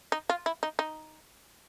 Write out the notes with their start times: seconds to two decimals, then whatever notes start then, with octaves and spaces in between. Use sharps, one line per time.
0.12 D#4
0.30 F4
0.46 E4
0.63 D#4
0.79 D#4